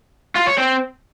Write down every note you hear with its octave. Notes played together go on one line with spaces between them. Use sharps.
F4
C#5
C4